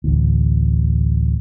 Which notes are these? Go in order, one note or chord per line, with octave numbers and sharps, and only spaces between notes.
A1 D2